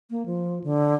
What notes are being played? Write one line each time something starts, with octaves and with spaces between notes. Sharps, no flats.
A#3
F3
D3